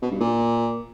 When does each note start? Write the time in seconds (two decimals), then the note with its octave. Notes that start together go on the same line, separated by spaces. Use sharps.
0.02 B2
0.11 G2
0.20 A#2